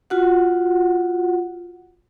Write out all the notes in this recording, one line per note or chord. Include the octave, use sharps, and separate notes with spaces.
F4 F#4 F#5